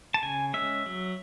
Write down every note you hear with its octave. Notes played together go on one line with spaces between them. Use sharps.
A5
C#3 G#5
G#3 C#4 E5
F#3